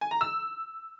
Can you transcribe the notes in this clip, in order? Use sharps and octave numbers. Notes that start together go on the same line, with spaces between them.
G#5
A#5
E6